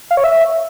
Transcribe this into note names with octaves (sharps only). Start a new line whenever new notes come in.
F5
C#5
E5